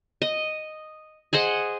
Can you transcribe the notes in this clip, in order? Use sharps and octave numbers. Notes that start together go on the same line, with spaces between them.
D#5
G#4 C5 D#5 F#5